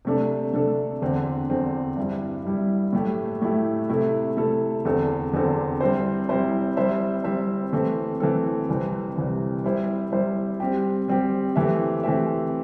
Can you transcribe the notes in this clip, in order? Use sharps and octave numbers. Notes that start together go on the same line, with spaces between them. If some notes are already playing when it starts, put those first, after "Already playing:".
C3 A3 D4 A4
C3 A3 D4 A4
E2 D3 C4
E2 D3 C4
G2 G3 E4
G2 G3 E4
A2 A3 E4 G4
A2 A3 E4 G4
C3 A3 E4 A4
C3 A3 E4 A4
E2 D3 C4 A4
E2 D3 C4 A4
G3 C4 E4 C5
G3 C4 E4 C5
G3 C4 E4 C5 E5
G3 C4 E4 C5 E5
E3 A3 C4 A4
E3 A3 C4 A4
C2 C3 E3 C4
C2 C3 E3 C4
G3 E4 C5
G3 E4 C5
G3 C4 G4
G3 C4 G4
E3 A3 C4 G4 E5
E3 A3 C4 G4 E5